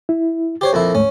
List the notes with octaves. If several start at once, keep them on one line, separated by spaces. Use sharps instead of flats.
E4
G4 C5 C#5
F2 A#2 E4 A4
D2 G#2 A3 C#4